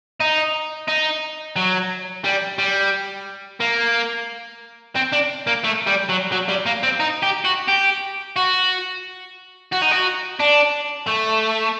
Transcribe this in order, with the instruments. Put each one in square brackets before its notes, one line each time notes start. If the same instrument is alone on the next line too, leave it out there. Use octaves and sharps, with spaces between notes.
[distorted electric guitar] D#4
D#4
F#3
G3
G3
A#3
C4
D4
A#3
A3
G3
F#3
F#3
G3
A#3
C4
D#4
G4
F#4
G4
F#4
F#4
D#4
F#4
D4
A3